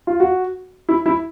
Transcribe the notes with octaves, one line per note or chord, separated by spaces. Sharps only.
F4
F#4
E4
E4